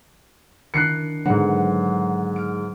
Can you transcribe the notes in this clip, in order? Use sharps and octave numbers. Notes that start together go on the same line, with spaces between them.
D#3 D4 E4 F#6 C7 C#7
G#2 D3 F#3 B3 F#5
F6 D7